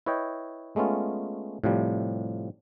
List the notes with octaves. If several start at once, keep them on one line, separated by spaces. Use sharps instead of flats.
E4 B4 C#5 D#5 G5
G#3 A3 B3 C#4 F4
A2 C3 F3 G3